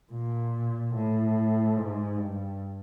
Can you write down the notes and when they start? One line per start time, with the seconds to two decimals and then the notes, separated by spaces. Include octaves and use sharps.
0.12 A#2
0.95 A2
1.77 G#2
2.17 G2